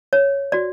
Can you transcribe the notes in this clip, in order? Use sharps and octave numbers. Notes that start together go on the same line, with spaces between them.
C#5
F#4 D5